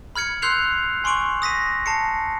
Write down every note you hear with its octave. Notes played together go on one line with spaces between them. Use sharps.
B5 F6 G#6 C#7
C6 E6 F#6 G6 C7 F7
G#5 C6 C#6 D7 F#7
D#6 A#6 B6 D#7
A5 A#5 C7 C#7